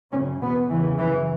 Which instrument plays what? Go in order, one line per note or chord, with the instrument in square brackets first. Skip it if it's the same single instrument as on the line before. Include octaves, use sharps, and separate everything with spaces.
[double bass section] C#3 C#4
F#2
E2 B2 B3
E2 C#3 E3
F#2 C#3 E3